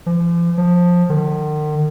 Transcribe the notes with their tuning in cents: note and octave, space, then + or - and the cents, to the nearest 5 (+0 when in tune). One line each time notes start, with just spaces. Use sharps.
F3 -40
F3 +15
D#3 -45